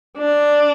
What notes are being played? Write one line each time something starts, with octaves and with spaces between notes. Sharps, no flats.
D4